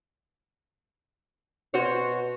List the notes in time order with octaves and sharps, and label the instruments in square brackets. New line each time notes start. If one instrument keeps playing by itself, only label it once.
[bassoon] B2 [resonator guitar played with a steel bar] F#4 C5 C#5